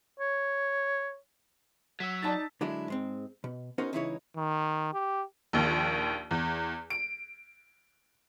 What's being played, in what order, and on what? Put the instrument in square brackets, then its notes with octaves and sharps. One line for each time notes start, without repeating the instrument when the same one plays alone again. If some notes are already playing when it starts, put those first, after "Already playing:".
[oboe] C#5
[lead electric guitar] F#3 [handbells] E6 B6
[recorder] D#4 [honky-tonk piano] D5 A5 A6
[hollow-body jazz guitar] D3 F#3 G#3 D4 E4
G#2 G#3 C4
B2
B3 C#4 D#4 F#4 A#4 C5
C#2 C#3 E3 D#4 E4 C#5
[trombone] D#3
G4
[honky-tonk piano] A#1 D#2
E2
D7